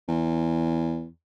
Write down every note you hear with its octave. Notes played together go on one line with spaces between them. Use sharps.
E2